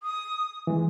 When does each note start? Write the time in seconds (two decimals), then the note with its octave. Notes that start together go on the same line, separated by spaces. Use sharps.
0.03 D#6
0.67 E3 G#3